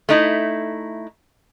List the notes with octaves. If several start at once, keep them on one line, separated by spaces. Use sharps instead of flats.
A3 D#4 E4